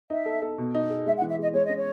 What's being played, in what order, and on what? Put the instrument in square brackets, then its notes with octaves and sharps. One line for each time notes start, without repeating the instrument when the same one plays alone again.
[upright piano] D#4 [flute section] E5
[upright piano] A4
A4
B2
D#4
G#4
[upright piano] G#3 [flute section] E5
[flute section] F#5
[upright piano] E3
[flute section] E5
[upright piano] G#3 [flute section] D#5
[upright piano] G#3 [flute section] C#5
[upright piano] C#4 [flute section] D#5
[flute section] C#5